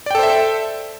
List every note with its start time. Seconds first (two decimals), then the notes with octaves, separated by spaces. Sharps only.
0.06 D5
0.11 G5
0.15 A4
0.19 C5
0.23 E5